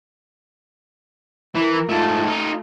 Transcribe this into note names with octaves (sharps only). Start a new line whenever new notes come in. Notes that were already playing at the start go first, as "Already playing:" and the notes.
E3 E4 A#4
G#2 A3 F4 A5
A3 D#4 F4